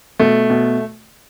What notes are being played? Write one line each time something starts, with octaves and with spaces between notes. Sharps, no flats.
B2 A3
B2